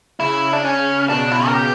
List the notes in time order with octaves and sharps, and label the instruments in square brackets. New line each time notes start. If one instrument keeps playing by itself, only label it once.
[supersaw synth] C#3 [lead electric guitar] E4
[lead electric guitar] D4
C#4
[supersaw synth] B2 [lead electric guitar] D4
[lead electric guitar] E4
A#4
G4